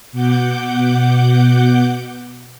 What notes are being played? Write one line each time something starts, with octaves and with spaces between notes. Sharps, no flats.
B2 F#5 D6 G6